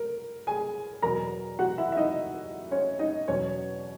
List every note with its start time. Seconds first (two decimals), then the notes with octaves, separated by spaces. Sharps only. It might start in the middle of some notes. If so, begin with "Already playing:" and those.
Already playing: A#4
0.47 G#4 G#5
1.02 E2 B2 F#3 A#4 A#5
1.59 F#4 F#5
1.78 E4 E5
1.92 E5
1.97 D#4 D#5
2.71 C#4 C#5
2.99 D#4 D#5
3.28 E2 B2 F#3 C#4 C#5